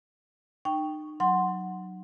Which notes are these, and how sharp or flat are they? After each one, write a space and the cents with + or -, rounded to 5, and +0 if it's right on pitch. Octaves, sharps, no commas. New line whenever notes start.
D#4 -35 G5 +0 C#6 +0
F#3 +0 F#5 +0 C6 +0